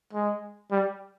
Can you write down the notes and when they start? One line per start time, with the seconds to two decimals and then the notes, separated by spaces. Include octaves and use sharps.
0.13 G#3
0.71 G3